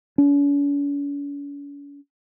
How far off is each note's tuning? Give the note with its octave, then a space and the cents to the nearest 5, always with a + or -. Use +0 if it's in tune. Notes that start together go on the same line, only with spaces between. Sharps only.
C#4 +45